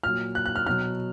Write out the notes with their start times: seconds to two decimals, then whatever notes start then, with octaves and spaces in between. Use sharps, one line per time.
0.04 A#2 F#3 F6
0.35 F#6
0.46 F#6
0.56 F6
0.67 B2 F#3 F6